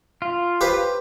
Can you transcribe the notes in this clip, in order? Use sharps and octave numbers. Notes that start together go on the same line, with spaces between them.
F4
G4 B4 C5